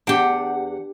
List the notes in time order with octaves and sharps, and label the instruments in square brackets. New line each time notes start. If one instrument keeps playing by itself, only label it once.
[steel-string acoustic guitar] E2 F#5 [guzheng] D4 G4